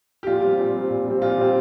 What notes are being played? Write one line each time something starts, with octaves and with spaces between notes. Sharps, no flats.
G4
A#2 F4
G3 C4
A#2
G3 C4
A#2
G3 C4
A#2 F4
G3 C4